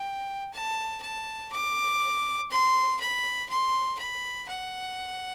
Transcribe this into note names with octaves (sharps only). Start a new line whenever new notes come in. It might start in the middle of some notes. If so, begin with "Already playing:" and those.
Already playing: G5
A5
A5
D6
C6
B5
C6
B5
F#5